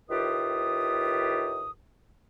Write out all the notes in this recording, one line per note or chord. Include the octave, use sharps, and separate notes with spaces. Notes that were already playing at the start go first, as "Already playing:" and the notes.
A2 D#3 F4 G4 B4 D#6